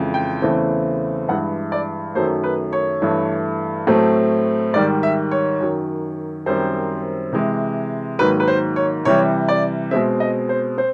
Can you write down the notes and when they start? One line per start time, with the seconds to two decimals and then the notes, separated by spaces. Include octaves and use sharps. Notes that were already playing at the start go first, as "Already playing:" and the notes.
Already playing: F2 C#3 E3 G#3
0.14 G5
0.42 E2 C#3 E3 A3 C4
1.28 G2 E3 G#3 F#5
1.72 D5
2.15 F#2 D#3 F#3 A3 C5
2.44 B4
2.73 C#5
3.02 G2 E3 A3
3.87 A2 F#3 A3 C4
4.74 G#2 D#3 G3 D5
5.03 E5
5.31 C#5
5.60 F#2 D#3 F#3
6.46 F#2 D#3 G3 C4 C5
7.33 C3 E3 G#3
8.19 G#2 D#3 F#3 A#3 B4
8.40 B4
8.48 C5
8.76 C#5
9.05 C3 E3 G3 C#5
9.48 D5
9.91 B2 G#3 C4 E5
10.20 D#5
10.49 C5
10.77 C4 C5